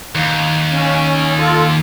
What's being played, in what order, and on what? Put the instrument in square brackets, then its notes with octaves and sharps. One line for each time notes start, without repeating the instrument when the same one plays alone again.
[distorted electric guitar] D#2
[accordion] C#4
F4 A4